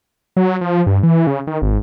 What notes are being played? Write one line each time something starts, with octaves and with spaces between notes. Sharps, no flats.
F#3
F3
G2
E3
C#3
D#3
G#1